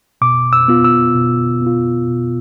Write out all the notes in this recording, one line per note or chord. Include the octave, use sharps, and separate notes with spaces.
B2 D6
E6
B3 F4
E6
B2
B3 F4
B2